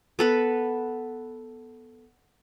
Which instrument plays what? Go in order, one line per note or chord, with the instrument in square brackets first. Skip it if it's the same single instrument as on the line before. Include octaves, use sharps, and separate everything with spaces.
[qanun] B3 A4 B4